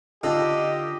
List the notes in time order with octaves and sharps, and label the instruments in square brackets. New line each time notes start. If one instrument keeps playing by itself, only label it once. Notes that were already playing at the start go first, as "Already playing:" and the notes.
[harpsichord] D3 D#4 A4 [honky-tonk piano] F4 [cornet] G4 [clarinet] D#5